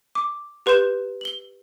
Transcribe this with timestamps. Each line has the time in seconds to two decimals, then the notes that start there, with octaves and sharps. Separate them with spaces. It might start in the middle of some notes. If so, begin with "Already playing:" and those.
0.15 D6
0.66 G4 B4 C6 G6 E7
1.21 F#7 G7